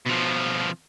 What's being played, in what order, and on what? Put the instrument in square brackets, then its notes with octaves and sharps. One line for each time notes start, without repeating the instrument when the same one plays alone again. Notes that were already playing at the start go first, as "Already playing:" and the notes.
[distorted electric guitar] B2 F3